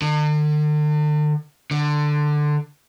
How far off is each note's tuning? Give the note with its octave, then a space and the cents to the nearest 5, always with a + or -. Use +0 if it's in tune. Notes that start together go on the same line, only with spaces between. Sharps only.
D3 +45
D3 +15